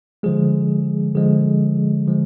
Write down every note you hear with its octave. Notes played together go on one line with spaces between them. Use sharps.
D3 F3 G#3 G#4
D3 F3 G#3 G#4
D3 F3 G#3